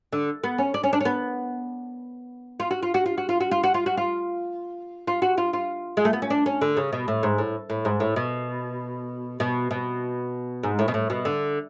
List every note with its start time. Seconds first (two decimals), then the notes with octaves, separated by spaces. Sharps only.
0.13 D3
0.43 B3
0.58 C#4
0.74 D4
0.84 C#4
0.93 D4
1.00 C#4
1.05 B3
2.60 F4
2.71 F#4
2.83 F4
2.94 F#4
3.06 F4
3.18 F#4
3.29 F4
3.40 F#4
3.51 F4
3.63 F#4
3.74 F4
3.86 F#4
3.97 F4
5.07 F4
5.22 F#4
5.38 F4
5.53 F4
5.97 G#3
6.05 A3
6.13 B3
6.22 C#4
6.30 D4
6.46 C#4
6.61 D3
6.77 C#3
6.93 B2
7.08 A2
7.23 G#2
7.38 A2
7.70 A2
7.85 G#2
8.00 A2
8.16 B2
9.40 B2
9.71 B2
10.63 G#2
10.79 A2
10.88 B2
10.94 A2
11.10 B2
11.25 D3